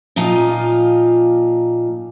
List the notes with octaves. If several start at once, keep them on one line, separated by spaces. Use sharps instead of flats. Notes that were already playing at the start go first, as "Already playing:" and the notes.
A#2 F3 D#4 F4 F5